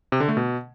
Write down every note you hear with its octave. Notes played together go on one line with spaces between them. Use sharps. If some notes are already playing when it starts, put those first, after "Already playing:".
C3
D3
A3
B2